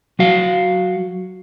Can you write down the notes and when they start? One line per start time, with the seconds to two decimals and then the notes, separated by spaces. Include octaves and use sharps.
0.19 F#3 F#4 F5